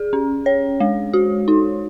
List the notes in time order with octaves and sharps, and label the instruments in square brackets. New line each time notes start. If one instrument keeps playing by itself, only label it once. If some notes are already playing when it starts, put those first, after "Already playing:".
Already playing: [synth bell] G#4
C#4
C#5
G#3
F#4
D#4